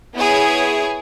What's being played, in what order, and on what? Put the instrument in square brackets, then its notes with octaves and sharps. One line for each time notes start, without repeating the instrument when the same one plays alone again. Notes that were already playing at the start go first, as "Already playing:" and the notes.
[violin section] B3 E4 G#4 C#5